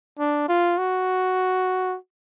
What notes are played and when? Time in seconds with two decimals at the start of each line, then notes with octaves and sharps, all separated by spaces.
0.19 D4
0.49 F4
0.78 F#4